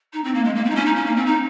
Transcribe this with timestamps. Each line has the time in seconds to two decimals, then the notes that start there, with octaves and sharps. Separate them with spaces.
0.13 D#4
0.24 C4
0.34 A#3
0.44 G#3
0.55 A#3
0.65 C4
0.70 D#4
0.75 C#4
0.85 D#4
0.95 C#4
1.06 A#3
1.16 C4
1.26 D#4